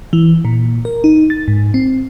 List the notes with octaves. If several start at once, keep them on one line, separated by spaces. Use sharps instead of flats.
E3
A#2
A#4
D#4
A6
G#2
C4